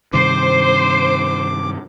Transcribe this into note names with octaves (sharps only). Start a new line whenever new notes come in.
G2 C3 D#3 C5 D6